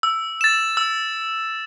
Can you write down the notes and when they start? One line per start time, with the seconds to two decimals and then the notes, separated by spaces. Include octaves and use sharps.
0.03 E6
0.41 A6 E7
0.77 E6